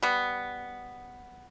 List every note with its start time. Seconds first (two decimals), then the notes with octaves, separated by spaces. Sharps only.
0.03 G3 B3